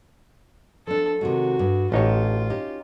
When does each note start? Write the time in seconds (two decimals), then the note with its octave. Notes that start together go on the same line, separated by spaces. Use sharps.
0.87 F3 D4 A4
1.21 C3 D#3 G#3 F#4
1.59 G2
1.92 A1 D#4 F4 G4 A4 C#5
2.50 C#4 D#4 G4